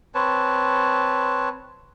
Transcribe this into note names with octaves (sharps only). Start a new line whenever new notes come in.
C4 B4 C#5 A5